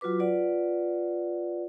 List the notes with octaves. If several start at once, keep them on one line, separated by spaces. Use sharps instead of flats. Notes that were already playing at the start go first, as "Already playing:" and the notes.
F#3 F4 F#4 B4 D6
F4 B4 D5 F#5